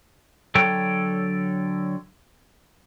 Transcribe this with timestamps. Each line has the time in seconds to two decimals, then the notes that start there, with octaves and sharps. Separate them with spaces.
0.55 D3 F#3 A4 C#5 G5